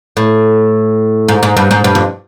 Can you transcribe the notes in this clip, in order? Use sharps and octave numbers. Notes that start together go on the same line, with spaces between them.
A2
G#2
G#2
G2
G#2
G2
F2